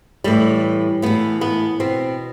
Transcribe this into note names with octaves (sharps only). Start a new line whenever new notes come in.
A2 E3 G3
A2 E3 B3
B3
B2 C4